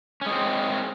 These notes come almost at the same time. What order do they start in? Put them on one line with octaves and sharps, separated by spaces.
C#4 G#3 C4